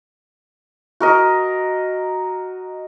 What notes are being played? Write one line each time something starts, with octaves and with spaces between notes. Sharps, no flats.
F#4 A#4 D#5